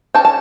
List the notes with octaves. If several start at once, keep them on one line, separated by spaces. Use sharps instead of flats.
C#4 G5 A5
A5